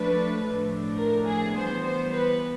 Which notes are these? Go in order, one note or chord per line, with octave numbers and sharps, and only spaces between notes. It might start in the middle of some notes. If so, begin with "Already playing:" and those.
Already playing: F3 A3 D4 B4
A2 F3 A3 D4
A#4
G#4
E3 G3 B3 C5
C5
B4